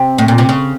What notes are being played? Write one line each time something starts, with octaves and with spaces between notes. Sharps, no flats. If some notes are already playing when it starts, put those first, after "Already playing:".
Already playing: C3
A2
A#2
C3
C#3